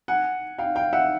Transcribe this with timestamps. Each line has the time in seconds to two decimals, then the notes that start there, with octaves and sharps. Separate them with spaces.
0.08 F#5 G#5
0.58 F5 G5
0.76 F5 G5
0.93 E5 F#5